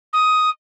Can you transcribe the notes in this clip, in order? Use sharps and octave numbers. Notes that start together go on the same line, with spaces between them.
D#6